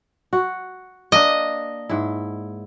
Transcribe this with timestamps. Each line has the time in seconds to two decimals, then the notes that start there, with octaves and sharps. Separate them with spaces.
0.33 F#4
1.12 A#3 D4 D#5
1.89 G#2 E4